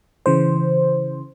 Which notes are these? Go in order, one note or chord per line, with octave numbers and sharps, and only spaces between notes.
C#3 E3 C5